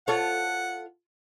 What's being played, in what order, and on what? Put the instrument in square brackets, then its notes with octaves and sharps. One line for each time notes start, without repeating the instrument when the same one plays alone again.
[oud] F4 A4 C#5 [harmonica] F#5